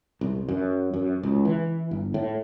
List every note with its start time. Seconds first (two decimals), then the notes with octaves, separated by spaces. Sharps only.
0.21 C2
0.49 F#2
0.94 F#2
1.23 C#2
1.45 E3
1.91 G1
2.14 A2